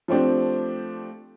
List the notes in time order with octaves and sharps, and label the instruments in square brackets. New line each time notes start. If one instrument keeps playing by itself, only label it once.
[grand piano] F3 A3 C4 D4 G4